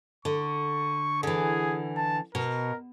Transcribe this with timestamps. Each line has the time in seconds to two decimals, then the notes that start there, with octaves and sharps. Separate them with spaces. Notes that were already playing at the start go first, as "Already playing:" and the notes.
0.25 D3 C#6
1.23 D3 E3 G#4
1.97 A5
2.35 B2 A#4